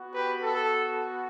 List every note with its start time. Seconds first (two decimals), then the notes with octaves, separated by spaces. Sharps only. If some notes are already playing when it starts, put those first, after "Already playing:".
Already playing: B3 F#4
0.13 G4 B4
0.43 A4